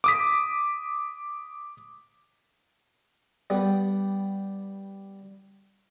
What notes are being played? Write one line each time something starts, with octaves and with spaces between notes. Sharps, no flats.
D6 D#6 B6
G3 B3